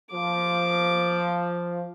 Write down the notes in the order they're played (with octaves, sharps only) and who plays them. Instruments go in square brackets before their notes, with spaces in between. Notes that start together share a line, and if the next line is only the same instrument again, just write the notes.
[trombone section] F3 [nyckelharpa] D6